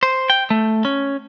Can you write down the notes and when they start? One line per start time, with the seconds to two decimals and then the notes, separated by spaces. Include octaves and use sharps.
0.03 C5
0.30 G5
0.50 A3
0.85 C#4